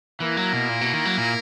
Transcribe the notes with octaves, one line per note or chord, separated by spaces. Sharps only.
E3 A#3 E4 A#4
F#3
B2
A#2
B2
D#3
F#3
A#2